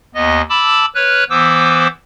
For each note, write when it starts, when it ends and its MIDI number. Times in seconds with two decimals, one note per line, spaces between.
0.15 0.42 39
0.15 0.42 59
0.15 0.42 75
0.49 0.86 81
0.49 0.86 83
0.49 0.86 86
0.49 0.86 88
0.95 1.24 71
0.95 1.24 73
0.95 1.24 89
0.95 1.24 90
1.30 1.87 52
1.30 1.87 59
1.30 1.87 72
1.30 1.87 86
1.30 1.87 88